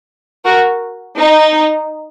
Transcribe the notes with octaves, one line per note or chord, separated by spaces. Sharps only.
F#4 A#4
D#4